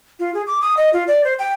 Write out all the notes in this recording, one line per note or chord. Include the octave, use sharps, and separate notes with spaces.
F4
G#4
D6
D#6
D#5
F4
D5
C5
G5